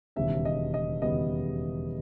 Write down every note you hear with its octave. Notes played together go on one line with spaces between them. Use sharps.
E1 D#2 C#3 G3 B3 E5
D#5
D#5
E1 D#2 C#3 G3 B3 D#5